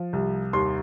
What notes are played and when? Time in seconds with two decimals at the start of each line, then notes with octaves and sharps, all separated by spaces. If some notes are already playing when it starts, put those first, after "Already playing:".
Already playing: F3
0.13 C2
0.53 D#2 C6